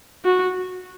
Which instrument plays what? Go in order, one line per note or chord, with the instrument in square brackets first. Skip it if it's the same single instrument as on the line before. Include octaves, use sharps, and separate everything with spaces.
[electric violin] F#4